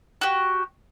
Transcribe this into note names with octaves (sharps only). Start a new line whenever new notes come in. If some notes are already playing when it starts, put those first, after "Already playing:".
F#4 G4